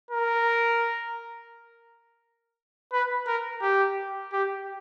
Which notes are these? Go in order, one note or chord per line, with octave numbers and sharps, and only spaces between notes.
A#4
B4
A#4
G4
G4